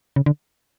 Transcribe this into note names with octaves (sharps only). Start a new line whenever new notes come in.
C#3
D3